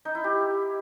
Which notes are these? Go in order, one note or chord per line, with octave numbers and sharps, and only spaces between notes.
D#4
E4
G4